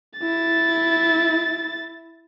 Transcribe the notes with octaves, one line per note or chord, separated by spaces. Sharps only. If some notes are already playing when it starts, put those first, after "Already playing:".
E4 A6